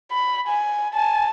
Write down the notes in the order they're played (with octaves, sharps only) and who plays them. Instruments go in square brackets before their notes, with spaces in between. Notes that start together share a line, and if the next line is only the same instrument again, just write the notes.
[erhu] B5
G#5
[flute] G#5 [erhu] A5